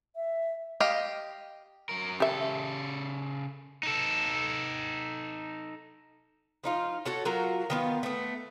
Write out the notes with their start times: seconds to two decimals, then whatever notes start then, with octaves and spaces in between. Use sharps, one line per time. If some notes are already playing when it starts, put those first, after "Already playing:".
0.16 E5
0.80 G4 D#5 F5
1.89 F#3 A#4
2.20 C#3 G4 A4 E5
3.83 D#4 A4
6.64 F3 D#4 F4
7.05 F#4 A4 C#5
7.25 F#3 F4 F#4 A#4
7.70 D#3 B3 F4
8.03 A3 B3